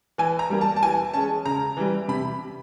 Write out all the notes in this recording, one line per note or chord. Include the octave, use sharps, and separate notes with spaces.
E3 G#5
A#5
G3 A#3
A5
A5
E3 G#5
G#3 C#4 A5
C#3 A#5
E3 G3
C3 B5